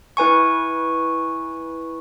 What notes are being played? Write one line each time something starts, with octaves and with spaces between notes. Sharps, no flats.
E4 B4 G#5 C#6